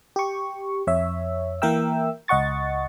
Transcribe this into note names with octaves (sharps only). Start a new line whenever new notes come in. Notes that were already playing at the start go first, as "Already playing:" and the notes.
G4 C#6
F2 C#5 E5
E3 A#3 A#4 E5 G5 E6
C#2 D#5 F#5 C#6 A6